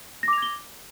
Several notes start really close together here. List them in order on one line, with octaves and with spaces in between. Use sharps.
A#6 D6 F7 G#6 G7